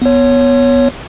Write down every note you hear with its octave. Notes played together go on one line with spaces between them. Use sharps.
B3 C#5